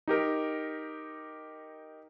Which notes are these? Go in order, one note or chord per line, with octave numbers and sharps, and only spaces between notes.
D#4 G4 A#4